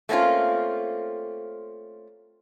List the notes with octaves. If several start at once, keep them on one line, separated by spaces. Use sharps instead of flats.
A3 A#3 C4 C#4 F4